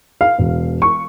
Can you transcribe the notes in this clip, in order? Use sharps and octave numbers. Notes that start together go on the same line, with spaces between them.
F5
E1
C#6